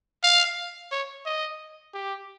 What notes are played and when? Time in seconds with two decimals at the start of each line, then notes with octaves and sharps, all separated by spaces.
0.23 F5
0.92 C#5
1.26 D#5
1.94 G4